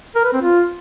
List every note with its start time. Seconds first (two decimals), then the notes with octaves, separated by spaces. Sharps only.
0.15 A#4
0.24 B4
0.33 C4
0.42 F4